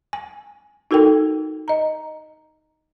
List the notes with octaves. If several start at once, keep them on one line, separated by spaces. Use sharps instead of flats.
G#5
D#4 F#4 A4 A#4 G5
D#5 A#5